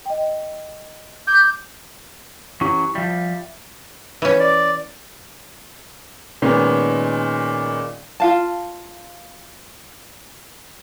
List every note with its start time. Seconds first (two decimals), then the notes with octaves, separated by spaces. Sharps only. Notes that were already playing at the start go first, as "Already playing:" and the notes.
0.06 D#5 G5
1.27 D6 G6
2.61 E3 F#3 C#4 E4 G4 C#6
2.95 F3 G3 E5
4.22 E3 C#4
4.40 D5
6.42 A#2 D#3 G#3 B3 C#4
8.20 F4 F5 A5